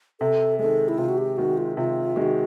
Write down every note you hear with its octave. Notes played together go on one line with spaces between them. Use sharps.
C3 A4
D#3 G#3 A4
E4
C3 F4
F#4
G4
D#3 G#3 F#4
F4
C3 F4
D#3 G#3 F#4